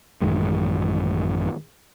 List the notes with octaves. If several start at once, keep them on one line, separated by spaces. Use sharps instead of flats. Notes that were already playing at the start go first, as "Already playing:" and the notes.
A1 F#2 D#3 G#3